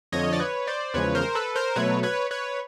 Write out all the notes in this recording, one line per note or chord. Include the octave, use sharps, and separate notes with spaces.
F2 D3 F3 C#5 D#5
D5
B4 C#5
C5 D5
E2 C#3 F3 G#3 B4 C#5
A#4 C5
A4 B4
A#4 C5
B2 F#3 A3 B4 C#5
B4 C#5
B4 C#5